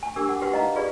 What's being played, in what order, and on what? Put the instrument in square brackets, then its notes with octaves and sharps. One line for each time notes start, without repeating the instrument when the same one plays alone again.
[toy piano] G#5
D4 G4 A#4 G#5 D6 E6
F#5 G#5 D6
F#4 G4 B4 F#5 C6
D#4 D#5 F5 A#5
F4 G4 G#4 B4 D5